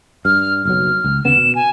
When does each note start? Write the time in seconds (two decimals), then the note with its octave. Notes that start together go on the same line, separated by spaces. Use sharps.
0.25 G2 F6
0.65 F#1 B1 F#3 F6
1.04 C#2
1.25 D#2 C#3 B3 E7
1.37 B2
1.55 G#5